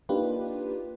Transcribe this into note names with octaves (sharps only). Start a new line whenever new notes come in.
A#3 D4 D#4 F4 G4 B4